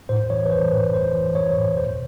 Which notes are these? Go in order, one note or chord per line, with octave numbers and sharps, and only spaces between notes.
A2 C5
E3 C#5
B4
E3 C5
A2 B4
A2 C5
E3
E3 C#5
A2
B2 C5